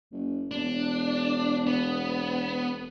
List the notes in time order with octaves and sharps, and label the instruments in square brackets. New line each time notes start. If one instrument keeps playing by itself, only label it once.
[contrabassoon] F#1
[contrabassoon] E1 [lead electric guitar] D4
[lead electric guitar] B3